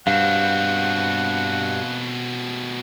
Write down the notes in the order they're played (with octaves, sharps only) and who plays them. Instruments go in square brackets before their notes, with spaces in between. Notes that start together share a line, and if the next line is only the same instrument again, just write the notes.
[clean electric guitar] G2 [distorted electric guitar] B2 C4 [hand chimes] F5 [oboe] F#5